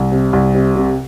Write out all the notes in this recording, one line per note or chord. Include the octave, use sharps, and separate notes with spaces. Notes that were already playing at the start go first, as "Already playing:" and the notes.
Already playing: C2
C3
C2
C3
C3